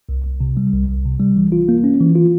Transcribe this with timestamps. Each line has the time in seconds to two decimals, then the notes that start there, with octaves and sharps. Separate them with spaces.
0.09 C2
0.25 C2
0.41 C3
0.57 G3
0.72 C2
0.88 C2
1.05 C3
1.20 G3
1.36 E3
1.52 F4
1.69 A#3
1.84 C#4
2.00 E3
2.15 F4